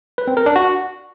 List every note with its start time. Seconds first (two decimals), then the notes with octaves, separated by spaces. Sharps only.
0.18 B4
0.27 C4
0.37 A#4
0.46 D4
0.56 F#4